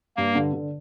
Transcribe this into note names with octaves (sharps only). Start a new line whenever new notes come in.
G2 A#3
D3
D3